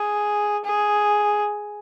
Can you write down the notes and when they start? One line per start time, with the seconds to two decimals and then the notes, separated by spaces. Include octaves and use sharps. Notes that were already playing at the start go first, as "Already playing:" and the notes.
Already playing: G#4
0.65 G#4